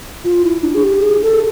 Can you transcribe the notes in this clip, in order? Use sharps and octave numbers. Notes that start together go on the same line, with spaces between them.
F4
E4
D4
G#4
G4
G#4
A4